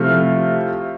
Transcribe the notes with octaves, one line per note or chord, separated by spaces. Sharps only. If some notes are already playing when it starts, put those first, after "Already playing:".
Already playing: C3 F3 A3 E4 F6